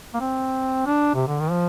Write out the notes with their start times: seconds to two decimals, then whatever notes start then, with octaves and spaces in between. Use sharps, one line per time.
0.14 A#3
0.20 C4
0.86 D4
1.14 C3
1.27 D3
1.40 D#3
1.51 F3